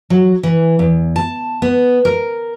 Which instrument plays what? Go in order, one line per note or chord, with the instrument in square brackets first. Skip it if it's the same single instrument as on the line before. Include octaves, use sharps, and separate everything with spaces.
[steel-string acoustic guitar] F#3
E3
E2
A5
B3
A#4